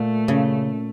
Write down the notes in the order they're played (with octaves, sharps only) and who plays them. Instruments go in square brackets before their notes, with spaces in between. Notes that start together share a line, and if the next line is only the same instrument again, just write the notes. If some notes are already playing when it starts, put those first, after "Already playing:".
Already playing: [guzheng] A#2 [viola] A3
[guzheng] C#3